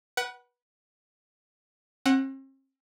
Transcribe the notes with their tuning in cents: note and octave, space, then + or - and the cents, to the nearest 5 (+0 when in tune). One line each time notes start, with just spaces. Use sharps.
B4 -25 F#5 +20
C4 +45 F#5 +0